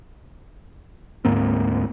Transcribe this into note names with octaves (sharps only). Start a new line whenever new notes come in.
D2 G#2 A#3 C4